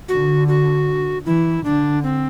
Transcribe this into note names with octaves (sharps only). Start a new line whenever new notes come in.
D3 F#4
F#4
E3 E4
D3 D4
C4